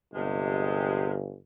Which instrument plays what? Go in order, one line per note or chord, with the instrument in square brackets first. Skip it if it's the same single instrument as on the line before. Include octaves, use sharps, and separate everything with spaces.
[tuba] G1 [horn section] C3 G#3